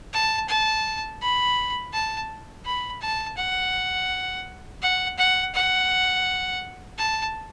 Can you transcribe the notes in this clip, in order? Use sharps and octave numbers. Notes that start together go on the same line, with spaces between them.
A5
A5
B5
A5
B5
A5
F#5
F#5
F#5
F#5
A5